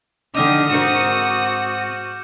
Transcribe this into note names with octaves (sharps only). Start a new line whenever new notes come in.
D3 D#4 G4 D6 D#6 F6
G#2 C4 F#4 A#4 G6 C#7 E7